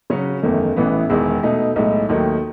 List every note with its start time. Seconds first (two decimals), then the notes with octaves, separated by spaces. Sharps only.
0.10 C#3 F#3 C#4 F#4
0.43 F#1 E2 D#3 A3
0.76 A1 A2 E3 B3
1.09 E1 E2 D#3 G#3
1.43 B2 A3 D#4
1.76 B1 A2 G#3 D#4
2.09 D#2 D#3 F#3 A3 D#4